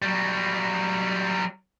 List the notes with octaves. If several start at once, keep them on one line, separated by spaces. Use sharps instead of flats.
F#3 G3